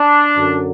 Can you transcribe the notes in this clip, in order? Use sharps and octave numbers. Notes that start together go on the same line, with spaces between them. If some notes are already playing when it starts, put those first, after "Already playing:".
Already playing: D4
F#2 D3 F#3